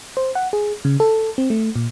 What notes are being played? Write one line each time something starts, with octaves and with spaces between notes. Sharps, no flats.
C5
F#5
G#4
C#3
A4
C4
A3
A#2